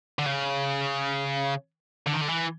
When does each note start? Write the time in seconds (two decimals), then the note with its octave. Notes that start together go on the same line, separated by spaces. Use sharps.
0.19 D3
0.26 C#3
2.07 D3
2.14 D#3
2.21 D3
2.29 E3